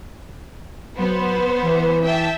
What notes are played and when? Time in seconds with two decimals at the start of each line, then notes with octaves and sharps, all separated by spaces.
0.98 F#3 B3 C5
1.62 E3
2.04 E5 G5 A5